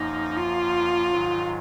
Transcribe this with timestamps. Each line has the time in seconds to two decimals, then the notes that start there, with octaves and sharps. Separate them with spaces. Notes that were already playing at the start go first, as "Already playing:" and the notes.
Already playing: F#2 F3 A#3 D#4
0.37 F4
1.12 G#2 D#3 F#3